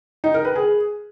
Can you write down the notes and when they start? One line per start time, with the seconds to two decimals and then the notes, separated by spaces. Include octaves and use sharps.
0.24 D#4
0.34 A#4
0.45 B4
0.55 G#4